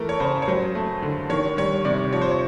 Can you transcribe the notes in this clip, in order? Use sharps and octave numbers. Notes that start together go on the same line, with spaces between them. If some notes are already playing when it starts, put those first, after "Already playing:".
Already playing: E3 A3 A4 A#4
C#5
C#3 C5
C#5
F#3 C5
A3
D3
D#3 C#5
G3 C#5
C3 D5
F3 C#5
C5
C#5